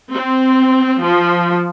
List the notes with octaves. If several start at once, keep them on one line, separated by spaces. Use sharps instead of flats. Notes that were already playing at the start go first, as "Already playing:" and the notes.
C4
F3